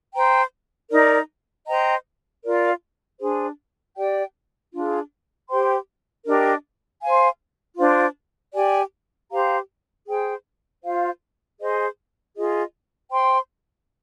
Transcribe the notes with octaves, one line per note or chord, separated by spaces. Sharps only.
C5 G5 A#5
D#4 A#4 D5
C5 D#5 G5 A#5
F4 A#4 D5 F5
D4 G#4 C5
G4 D5 G5
D4 F4 G#4
G4 C5 G5 C6
D4 G4 A#4 D#5
C5 F5 G#5
D4 F4 C5
G4 D5 G#5
G4 C5 F5 A#5
G#4 C5 G5
F4 C5 F5
G#4 C5 D#5 G#5
F4 G#4 D#5
C5 G5 C6